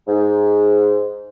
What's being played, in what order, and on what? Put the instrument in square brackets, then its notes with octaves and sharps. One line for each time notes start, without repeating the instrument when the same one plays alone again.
[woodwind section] G#2